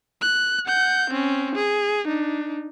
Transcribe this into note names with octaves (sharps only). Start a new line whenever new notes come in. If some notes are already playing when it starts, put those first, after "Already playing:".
F#6
F#5 G6
C4 C#4
G#4
D4 D#4